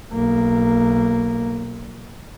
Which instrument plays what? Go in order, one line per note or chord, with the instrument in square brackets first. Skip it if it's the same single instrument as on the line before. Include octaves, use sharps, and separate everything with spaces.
[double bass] B1 A#3